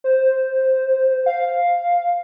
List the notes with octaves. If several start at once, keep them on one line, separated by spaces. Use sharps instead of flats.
C5
F5